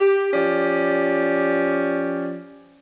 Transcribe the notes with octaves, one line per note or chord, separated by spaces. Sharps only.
G4
F3 C#4 G4 D5